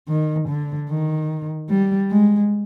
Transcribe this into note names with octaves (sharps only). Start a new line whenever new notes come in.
D#3
D3
D#3
G3
G#3